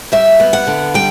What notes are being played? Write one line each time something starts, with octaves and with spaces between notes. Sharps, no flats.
G3 E5
B3
F#5
D3
G3 G5